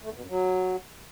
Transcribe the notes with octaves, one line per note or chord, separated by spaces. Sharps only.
A3
E2
B2
F#2
F#3